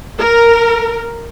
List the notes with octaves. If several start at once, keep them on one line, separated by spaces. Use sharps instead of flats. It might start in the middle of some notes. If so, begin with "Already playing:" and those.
A#4